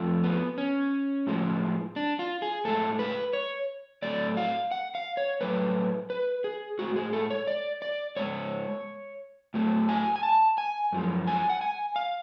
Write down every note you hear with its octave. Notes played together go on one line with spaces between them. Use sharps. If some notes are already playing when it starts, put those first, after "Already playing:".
Already playing: F2 F3 A3
B3
C#4
A2 F3 G#3
D4
F4
G#4
A2 G#3 A4
B4
C#5
A2 F#3 A3 D5
F5
F#5
F5
C#5
A2 F#3 A3 B4
B4
G#4
A2 G#3 F#4
G#4
A4
C#5
D5
D5
G#2 G#3 C#5
A2 F#3 A3
G#5
G#5
A5
G#5
F#2 F3 G#3
G#5
F#5
G#5
F5